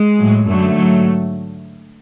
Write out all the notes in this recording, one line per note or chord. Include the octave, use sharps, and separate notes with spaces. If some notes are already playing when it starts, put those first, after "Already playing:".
Already playing: G#3
A2 F#3
F#2 D3 F#3 A3
G#2 F#3